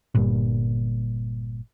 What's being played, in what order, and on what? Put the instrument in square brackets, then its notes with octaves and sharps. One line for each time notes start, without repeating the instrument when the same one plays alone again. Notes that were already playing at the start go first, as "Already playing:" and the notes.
[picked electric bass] G1 G2 A#2